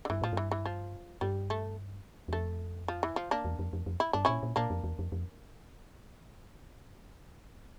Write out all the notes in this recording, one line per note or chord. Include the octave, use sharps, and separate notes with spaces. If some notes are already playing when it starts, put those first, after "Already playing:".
D3
G2 E3
A2 F3
G2 E3
E3
F3
G2 G3
A3
E2
F2 A3
F3
E3
F3
A#3 D4
E2
F2
F2
F2
E4
G2 D4
A#2 C#4 E4
A#2
A#2 A#3 D4
F2
E2
F2
F2